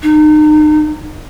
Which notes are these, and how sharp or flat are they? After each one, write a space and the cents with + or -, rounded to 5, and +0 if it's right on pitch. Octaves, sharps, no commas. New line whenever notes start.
D#4 -35